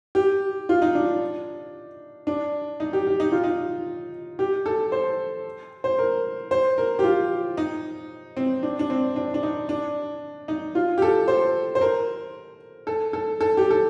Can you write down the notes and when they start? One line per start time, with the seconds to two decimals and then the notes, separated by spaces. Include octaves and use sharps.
0.15 G4
0.69 F4
0.82 D#4
0.95 D4
2.27 D4
2.80 D#4
2.93 G4
3.07 G4
3.20 D#4
3.32 F4
3.44 D#4
4.39 G4
4.66 A4
4.92 C5
5.84 C5
5.98 A#4
6.51 C5
6.78 A#4
6.99 G4
7.04 F4
7.57 D#4
8.37 C4
8.63 D4
8.79 D4
8.90 C4
9.16 D4
9.34 D4
9.43 D#4
9.69 D4
10.48 D#4
10.75 F4
10.98 G4
11.02 A4
11.28 C5
11.75 C5
11.81 A#4
12.87 A4
13.13 A4
13.41 A4
13.57 G4
13.70 A4